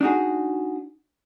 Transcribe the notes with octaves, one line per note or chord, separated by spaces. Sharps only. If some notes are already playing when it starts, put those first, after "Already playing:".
D4 D#4 F#4 G#4